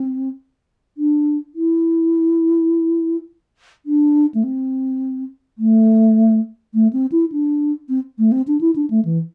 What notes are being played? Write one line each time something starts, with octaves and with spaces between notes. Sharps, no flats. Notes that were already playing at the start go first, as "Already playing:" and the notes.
Already playing: C4
D4
E4
D4
A3
C4
A3
A3
C4
E4
D4
C4
A3
C4
D4
E4
D4
A3
E3